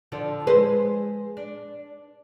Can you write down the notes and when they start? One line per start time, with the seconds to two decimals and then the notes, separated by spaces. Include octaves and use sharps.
0.12 D3 F3 D4
0.47 G#3 B4 C5
1.37 D4